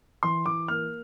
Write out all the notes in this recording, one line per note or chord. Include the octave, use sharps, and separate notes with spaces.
E3 C6
E3 D6
A#3 F6